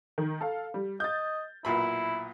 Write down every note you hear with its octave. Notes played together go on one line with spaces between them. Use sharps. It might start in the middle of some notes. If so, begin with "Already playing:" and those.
D#3
A4 F5
G3
D#5 G6 A6
B1 A#2 E4 B5